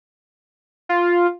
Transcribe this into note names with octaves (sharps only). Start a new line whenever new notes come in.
F4